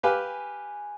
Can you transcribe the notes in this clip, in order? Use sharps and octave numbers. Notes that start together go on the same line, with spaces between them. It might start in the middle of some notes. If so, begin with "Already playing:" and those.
G4 B4 F5 G#5